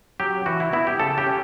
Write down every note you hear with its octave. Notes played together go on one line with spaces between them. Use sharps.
F#3 C#4 G4
E3 F#4
E4
B3 E4
G4
C#3 A4
G4
C#4